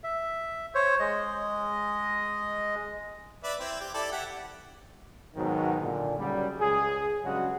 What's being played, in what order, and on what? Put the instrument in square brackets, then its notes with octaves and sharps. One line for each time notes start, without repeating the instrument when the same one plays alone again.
[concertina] E5
C5 C#5
G#3 D#5
[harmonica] B4 D5 E5
C4 E4
G4
E4 A4 D5
G4 E5 F#5
[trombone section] G#2 B2 D#3 F#3
A#2 D3
F#2 C#3 F#3 G3
C#2 G#4
G2 C#3 F#3 G#3 F#4